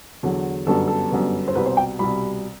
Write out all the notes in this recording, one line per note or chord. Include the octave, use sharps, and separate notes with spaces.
E2 D3 F#3
G1 F#2 D3 G3 B3 A4
A4
G1 F#2 D3 G3 B3
C5
C2 B2 G3 B4
C5
G5
C2 B2 G3 B5